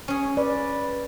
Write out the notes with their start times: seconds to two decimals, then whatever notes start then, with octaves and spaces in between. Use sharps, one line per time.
0.08 C#4 G#4
0.37 B4 D5